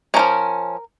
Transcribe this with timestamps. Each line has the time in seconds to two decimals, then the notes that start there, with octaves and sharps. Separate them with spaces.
0.14 A#3 C#4 A#4
0.19 F3